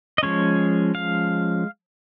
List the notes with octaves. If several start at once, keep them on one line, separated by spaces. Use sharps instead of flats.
D#5
F3 G#3 C#4 C#5
F5